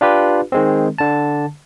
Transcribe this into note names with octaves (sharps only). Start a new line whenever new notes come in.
D4 F4 G4 B4
D#3 G#3 C4
D3 A5